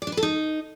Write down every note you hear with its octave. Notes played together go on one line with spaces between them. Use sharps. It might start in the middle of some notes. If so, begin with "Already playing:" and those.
D5
D4
B4
A4
D#4